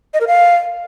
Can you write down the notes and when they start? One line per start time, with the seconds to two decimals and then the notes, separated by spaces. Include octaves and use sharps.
0.14 D#5
0.21 A#4
0.27 F5